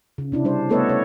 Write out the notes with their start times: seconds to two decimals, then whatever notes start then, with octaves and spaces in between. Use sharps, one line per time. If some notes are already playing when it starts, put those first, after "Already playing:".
0.18 C#3
0.32 C3 D4 E4
0.45 G3 D4 C5
0.69 A3 B3 A4 B4 C#5 D#5
0.89 C#5